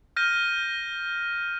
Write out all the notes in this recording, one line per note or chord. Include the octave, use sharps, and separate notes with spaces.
F6 G6 A#6 D#7